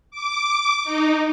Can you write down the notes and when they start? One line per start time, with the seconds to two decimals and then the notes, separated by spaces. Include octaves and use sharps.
0.11 D6
0.84 D#4